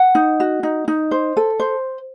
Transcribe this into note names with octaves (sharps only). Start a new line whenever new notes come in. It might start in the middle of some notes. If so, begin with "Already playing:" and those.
Already playing: F#5
D#4
F#4
D#4
D#4
C5
A4
C5